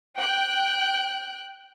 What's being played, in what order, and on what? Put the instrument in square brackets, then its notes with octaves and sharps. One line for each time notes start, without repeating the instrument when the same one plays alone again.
[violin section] G5 F#6